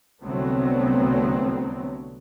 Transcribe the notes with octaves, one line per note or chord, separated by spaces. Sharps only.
C2 D3 F#3 A3 B3 C4